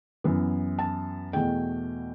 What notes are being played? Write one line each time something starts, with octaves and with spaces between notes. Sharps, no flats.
F#2 E3 B3
A5
E2 B2 A3 G5